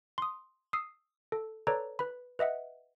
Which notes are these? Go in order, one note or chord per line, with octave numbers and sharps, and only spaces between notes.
C6 D#6
D#6 E6 C7
A4
A4 B4 C#5 D5 A#5
B4 B5
B4 D#5 E5 F#5